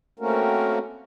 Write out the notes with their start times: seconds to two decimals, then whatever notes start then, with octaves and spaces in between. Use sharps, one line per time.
0.19 A3 A#3 C4 C#4 F#4 A#4